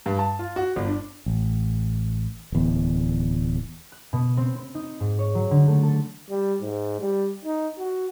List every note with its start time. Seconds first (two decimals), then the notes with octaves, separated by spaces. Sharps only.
0.06 G2
0.18 A5
0.39 F4
0.56 F#4
0.76 G1
0.87 D4
1.26 A1
2.52 D1 E2
3.92 F#6
4.13 B2
4.37 C4
4.58 C4
4.75 D#4
5.00 G#2
5.19 C#5
5.35 F#3
5.51 D3
5.68 A3
5.83 A4
6.30 G3
6.61 G#2
7.00 G3
7.45 D#4
7.78 F#4